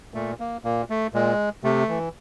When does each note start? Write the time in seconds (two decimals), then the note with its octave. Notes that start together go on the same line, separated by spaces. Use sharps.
0.14 A#2 A3
0.40 A#3
0.64 A#2 A#3
0.90 A3
1.14 A#2 G#3
1.64 C3 A3
1.89 E3